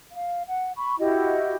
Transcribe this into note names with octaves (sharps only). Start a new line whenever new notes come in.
F5
F#5
B5 C#6
E4 F#4 G4 D#5